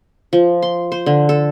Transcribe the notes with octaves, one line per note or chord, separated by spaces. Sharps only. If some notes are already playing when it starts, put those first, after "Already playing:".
F3
C6
C5
D3
A4